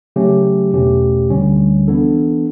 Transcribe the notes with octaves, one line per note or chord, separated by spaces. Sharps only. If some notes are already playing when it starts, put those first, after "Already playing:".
C#3 F#3 A3 C#4 G4
E2 B2 A3 C#4 G4
D2 D3 G3 C#4
E3 B3 D4 A4